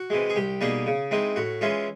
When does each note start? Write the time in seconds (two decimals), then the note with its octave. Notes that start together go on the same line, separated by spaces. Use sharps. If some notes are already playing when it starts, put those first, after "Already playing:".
Already playing: F#4
0.10 C3 E3 G#3
0.30 G#4
0.36 C2 G4
0.61 B2 G3 A#3 D#4 G#4
0.86 C#3
1.11 E3 G#3 C4 D#4
1.36 A2 F#4
1.61 E3 G#3 C#4 E4 F4